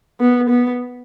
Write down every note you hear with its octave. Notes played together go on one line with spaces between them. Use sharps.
B3
B3